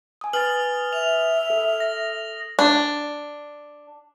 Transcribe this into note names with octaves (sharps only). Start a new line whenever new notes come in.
G#5 D#6
B4 G#5 D#6 F6 A6 F#7
E5 F7
A4
A#6
D4